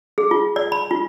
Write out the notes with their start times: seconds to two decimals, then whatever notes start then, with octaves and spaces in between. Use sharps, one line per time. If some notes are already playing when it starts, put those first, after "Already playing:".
0.18 G#4
0.31 F4
0.56 D5
0.72 B5
0.91 F4